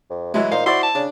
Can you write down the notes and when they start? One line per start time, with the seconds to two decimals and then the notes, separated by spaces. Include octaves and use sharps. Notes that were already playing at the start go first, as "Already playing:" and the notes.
0.10 F2
0.34 E3 F#3 G#3 E4
0.51 A#2 D#4 C5 F5
0.66 E4 F#4 C5 D5 C6
0.83 A5
0.95 C#3 D4